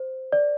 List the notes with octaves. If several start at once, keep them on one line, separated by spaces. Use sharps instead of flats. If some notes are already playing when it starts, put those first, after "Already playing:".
Already playing: C5
D5